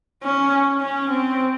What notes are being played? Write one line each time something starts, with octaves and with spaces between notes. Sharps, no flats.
C#4
C#4
C4